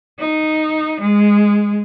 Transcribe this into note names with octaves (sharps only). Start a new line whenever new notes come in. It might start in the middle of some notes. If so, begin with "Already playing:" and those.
D#4
G#3